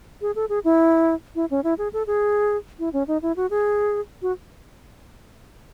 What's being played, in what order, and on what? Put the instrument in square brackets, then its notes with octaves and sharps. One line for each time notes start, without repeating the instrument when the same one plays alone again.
[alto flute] G#4
A4
G#4
E4
E4
C#4
E4
G#4
A4
G#4
E4
C#4
D#4
E4
F#4
G#4
F#4